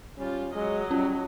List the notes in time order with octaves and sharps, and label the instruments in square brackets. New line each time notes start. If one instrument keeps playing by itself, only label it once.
[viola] G3 F4 [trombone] C#4
[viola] F#3 D#5 [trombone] G#3
[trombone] G3 [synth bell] C#4